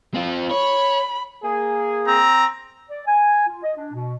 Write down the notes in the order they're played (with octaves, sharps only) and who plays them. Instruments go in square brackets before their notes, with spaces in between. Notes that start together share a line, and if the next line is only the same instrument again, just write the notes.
[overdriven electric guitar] C4 F4
[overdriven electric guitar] C#5 [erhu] B5
[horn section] A#3 G#4
[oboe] C4 [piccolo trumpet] A#5
[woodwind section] D5
G#5
F4
D#5
D4
B2